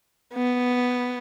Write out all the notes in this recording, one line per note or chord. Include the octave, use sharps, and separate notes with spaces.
B3